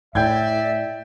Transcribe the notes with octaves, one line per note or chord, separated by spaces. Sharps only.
A2 D5 E5 G5 G6 G#6